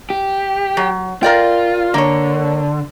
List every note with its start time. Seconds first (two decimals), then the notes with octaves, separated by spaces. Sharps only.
0.10 G4
0.77 F#3
1.23 F4 A#4 D5 G5
1.94 D3 A#3 C#5